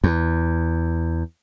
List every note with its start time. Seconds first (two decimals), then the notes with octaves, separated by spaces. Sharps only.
0.04 E2